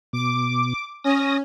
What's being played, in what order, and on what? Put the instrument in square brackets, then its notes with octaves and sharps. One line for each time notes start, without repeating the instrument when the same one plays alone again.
[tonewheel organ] B2 [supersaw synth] D6
[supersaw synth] C#4 [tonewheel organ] D#6 A#6